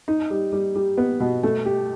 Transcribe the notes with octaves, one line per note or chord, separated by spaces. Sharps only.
D#4
G3
G3
G3
B3
B2
A3
G4